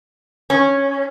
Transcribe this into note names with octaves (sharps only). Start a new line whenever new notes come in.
C#4